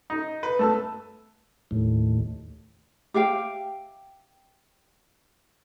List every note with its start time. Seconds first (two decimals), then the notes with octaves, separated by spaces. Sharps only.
0.10 D#4
0.43 B4
0.59 A3 A5 E6
1.71 D#2 A2
3.14 G4 E5 F5 G5